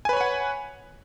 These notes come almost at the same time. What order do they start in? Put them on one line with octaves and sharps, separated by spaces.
G#5 B4 C#5 B5 F#5